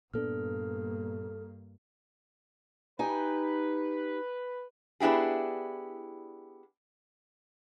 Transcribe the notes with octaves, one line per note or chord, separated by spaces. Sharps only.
G2 A#2 A#3 B3 D4 A4 F6
D#4 G4 B4 G#5
B3 D4 E4 G4 G#4